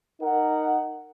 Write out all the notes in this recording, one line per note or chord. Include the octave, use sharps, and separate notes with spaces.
D#4 A#4 F#5